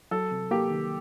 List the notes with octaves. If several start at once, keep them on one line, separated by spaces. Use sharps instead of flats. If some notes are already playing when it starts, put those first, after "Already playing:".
F#3 A4
C3
A#3 G4
D#3